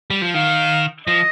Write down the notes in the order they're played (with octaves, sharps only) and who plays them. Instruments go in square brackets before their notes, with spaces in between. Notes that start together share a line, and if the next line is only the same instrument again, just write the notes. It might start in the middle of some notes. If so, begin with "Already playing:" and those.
[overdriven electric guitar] G3
F3
[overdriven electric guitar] D#3 [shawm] F5
[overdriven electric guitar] F3 [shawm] D#5